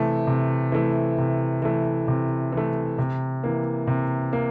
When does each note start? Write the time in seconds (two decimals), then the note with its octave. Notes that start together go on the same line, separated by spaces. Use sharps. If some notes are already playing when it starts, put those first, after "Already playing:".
Already playing: C3 E3 A3
0.27 C3
0.72 E3 A3
1.18 C3
1.62 E3 A3
2.08 C3
2.52 E3 A3
2.98 C3
3.44 E3 A#3
3.87 C3
4.33 A#3